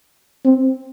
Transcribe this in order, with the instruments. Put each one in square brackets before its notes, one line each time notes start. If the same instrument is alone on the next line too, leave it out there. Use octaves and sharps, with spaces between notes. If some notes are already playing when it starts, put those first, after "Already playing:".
[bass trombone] C4